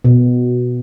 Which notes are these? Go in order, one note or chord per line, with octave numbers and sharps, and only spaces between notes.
B2